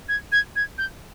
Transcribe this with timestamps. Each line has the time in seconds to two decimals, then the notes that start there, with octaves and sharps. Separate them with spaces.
0.09 G#6
0.32 G#6
0.56 G#6
0.78 G6